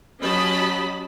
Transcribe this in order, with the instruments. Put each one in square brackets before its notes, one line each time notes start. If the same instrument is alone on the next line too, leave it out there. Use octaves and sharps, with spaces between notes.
[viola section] F#3 C#4 G4 D#5 A5 B5